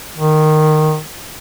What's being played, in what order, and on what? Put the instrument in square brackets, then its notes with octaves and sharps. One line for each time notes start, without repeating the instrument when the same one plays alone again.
[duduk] D#3